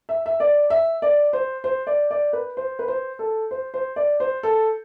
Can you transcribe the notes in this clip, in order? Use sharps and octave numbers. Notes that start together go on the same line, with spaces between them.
E5
E5
D5
E5
D5
C5
C5
D5
D5
B4
C5
B4
C5
A4
C5
C5
D5
C5
A4